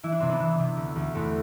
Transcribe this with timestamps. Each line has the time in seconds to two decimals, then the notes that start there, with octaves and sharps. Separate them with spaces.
0.03 E3 E4
0.12 D4
0.20 C3 C4
0.29 B3 D4
0.40 E3
0.59 C3
0.77 D2
0.96 D2
1.15 E2 A3 C4